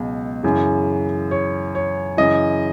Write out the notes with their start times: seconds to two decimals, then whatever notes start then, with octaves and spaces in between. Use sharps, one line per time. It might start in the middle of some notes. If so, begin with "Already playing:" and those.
Already playing: C#2 B2 F#3
0.43 F#2 C#3 E3
1.31 C#5
1.75 C#5
2.17 F#2 C#3 E3 D#5